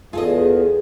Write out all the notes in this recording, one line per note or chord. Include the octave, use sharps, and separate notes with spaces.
E2 F4 G#4 A4 D#5